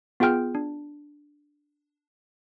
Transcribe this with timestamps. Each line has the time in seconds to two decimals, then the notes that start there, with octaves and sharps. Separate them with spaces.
0.20 B3 F4 G#4 G5 F6 G6
0.55 D4